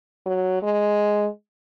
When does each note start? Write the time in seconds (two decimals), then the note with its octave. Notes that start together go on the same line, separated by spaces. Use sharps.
0.26 F#3
0.62 G#3